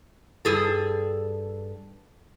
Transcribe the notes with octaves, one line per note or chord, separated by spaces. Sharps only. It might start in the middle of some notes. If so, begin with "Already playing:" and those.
G2 G#4 A4